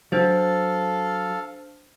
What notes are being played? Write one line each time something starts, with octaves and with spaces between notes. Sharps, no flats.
F#3 D4 A4 C5 F5 A6